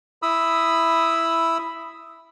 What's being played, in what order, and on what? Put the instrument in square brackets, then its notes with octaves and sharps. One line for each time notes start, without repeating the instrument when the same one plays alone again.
[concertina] E4 B5 D#6 E6